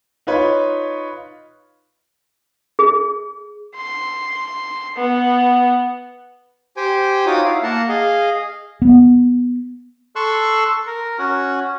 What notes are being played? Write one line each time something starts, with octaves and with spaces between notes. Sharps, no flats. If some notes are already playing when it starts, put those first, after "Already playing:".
D#4 F4 B4 C#5
G#4
C6
B3
G4 C5 G5 G#5
D#4 F4 F#4 C#5 D6 D#6
E4 F5
A#3 A#4 F#5 A5
G#4 D#5 F5
B3
A4 C6 C#6 E6 F#6
A#4
C#4 F#4